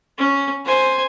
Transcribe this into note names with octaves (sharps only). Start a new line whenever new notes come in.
C#4
C5 G#5